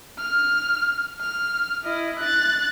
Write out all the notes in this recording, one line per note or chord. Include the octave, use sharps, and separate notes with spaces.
F6
F6
E4 D#5
F#6 A6